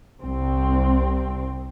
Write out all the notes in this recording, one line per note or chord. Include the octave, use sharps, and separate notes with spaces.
C2 C4